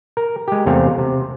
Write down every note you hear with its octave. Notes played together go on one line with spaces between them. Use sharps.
A#4
G#3 G4
E2 C3 A3 C4 F5
C3